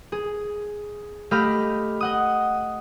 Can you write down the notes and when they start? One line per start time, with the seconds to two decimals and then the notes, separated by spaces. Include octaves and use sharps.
0.12 G#4
1.31 A3 G4 D#5 F5 B5 F6
2.00 D#5 F#5 D#6